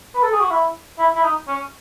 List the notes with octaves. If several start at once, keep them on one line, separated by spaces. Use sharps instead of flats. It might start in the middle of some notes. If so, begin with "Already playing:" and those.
B4
A4
G#4
F#4
E4
E4
E4
D#4
C#4